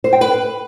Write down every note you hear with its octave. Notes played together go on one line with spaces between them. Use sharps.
C5
G5
B4